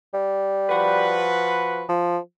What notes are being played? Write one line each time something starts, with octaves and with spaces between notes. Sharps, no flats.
G3
F3 F#4 B4
F3